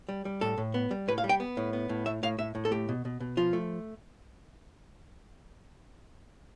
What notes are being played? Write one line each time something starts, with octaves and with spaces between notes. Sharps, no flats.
G3
G3
A2 A4
A2
B3
G3
A2 B4
F5
G3
G5
B3
A2
B3
A2
A3 E5
A2 F5
A2 E5
A2
A4
A3 G4
B2
B2
B2
F3 F4
A3